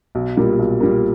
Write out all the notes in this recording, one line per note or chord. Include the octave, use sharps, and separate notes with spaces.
B1
A#2 G3 A#3
B1
A#2 G3 A#3